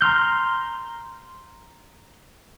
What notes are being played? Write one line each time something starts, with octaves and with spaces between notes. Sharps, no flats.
A#5 C6 F6 G6